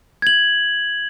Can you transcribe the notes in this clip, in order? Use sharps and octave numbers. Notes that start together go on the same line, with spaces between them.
G#6 F#7